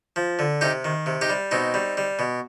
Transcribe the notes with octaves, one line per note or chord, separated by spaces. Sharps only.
F3
D3
C3 D#4 G4
D#3
C3
D#4 G4
G3
B2 C4 D#4
G3
G3
B2